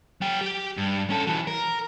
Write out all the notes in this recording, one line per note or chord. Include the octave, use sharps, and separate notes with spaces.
F#3 G5
G4
G2
C#4 A4
E3 F#3
A#4